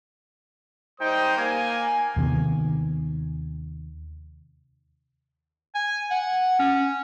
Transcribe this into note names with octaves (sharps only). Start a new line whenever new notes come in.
G3 D#4 C5 G5 D#6
A#3 G#5
D#2 C3 D#3 B3
G#5
F#5
C#4